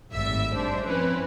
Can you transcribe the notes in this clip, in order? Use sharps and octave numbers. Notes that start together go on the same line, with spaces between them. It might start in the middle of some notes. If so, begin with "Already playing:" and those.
G#1 A2 G3 E5
G3 G#3 D4 C5
F3 C4 C#4 E4 B4